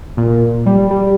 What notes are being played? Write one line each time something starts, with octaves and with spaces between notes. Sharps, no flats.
A#2
G3
G3